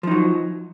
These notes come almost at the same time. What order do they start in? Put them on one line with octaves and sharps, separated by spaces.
F3 D#4 F#3